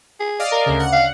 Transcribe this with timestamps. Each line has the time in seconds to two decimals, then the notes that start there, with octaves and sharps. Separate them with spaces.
0.20 G#4
0.39 D5 D#5 F5
0.52 A#4
0.66 D2 C#3
0.80 F#5
0.92 F5